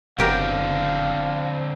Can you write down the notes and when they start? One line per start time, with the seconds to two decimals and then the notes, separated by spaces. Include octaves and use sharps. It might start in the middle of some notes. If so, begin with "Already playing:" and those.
0.19 F#1 B2 D3 C4 D4 G4 A#4 F5